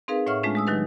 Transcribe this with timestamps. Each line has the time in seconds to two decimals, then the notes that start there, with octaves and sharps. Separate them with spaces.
0.08 C4 D#4 G#4 A#4 B4 F5
0.26 A2 C#5 E5 F#5 C#6 F6
0.43 G#3 A3 C#4 D4 F4
0.55 G#3 D#6 E6
0.67 D#3 F#3 D#4 G4 B4